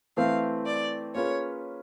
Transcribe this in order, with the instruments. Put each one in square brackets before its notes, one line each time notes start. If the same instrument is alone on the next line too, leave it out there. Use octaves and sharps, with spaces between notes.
[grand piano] E3 A3 C4 [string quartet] F5
[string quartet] D5
[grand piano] A#3 C#4 F4 G#4 B4 [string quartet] C#5